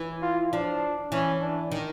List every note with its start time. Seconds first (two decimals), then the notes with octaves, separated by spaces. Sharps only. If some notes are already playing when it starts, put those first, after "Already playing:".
Already playing: E3
0.22 F4
0.53 F3 D4
1.12 E3 C#4
1.41 D4
1.71 D#3